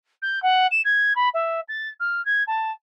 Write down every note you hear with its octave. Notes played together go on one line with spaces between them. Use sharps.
G6
F#5
E7
G#6
B5
E5
A6
F6
G#6
A5